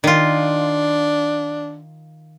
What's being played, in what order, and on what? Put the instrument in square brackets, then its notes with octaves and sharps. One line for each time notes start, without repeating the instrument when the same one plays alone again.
[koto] D#3 F4 [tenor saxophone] D4